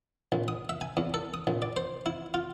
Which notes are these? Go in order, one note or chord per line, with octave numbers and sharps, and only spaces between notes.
A#1
D#6
E5
G#5
E2
A4
D#6
A#1
D5
C5
E4
F4